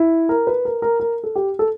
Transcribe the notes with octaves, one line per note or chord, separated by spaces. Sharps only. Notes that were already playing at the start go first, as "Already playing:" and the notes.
Already playing: E4
A#4
B4
A#4
A#4
A#4
A4
G4
A4